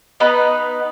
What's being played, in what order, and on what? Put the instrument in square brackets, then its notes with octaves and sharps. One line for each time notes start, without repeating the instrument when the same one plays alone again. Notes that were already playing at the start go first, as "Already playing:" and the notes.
[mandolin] B3 D#4 B4